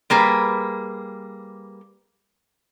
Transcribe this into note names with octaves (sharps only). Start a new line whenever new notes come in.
G3 A#3 G#4 B4